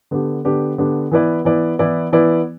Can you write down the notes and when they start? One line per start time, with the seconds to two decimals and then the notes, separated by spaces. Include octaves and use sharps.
0.11 D3 B3 D4 G4
0.45 D3 B3 D4 G4
0.78 D3 B3 D4 G4
1.11 E3 B3 E4 B4 D5
1.45 E3 B3 E4 B4 D5
1.79 E3 B3 E4 B4 D5
2.12 E3 B3 E4 B4 D5